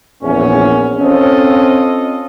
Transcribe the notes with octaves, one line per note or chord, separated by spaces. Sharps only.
A#1 E2 C#4
C4 C#4 F4 A4 D#5